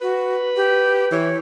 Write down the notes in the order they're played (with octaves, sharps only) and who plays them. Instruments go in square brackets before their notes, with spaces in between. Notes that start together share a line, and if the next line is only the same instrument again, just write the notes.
[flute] F#4 [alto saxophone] B4
[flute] G4
[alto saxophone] E3 [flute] C#5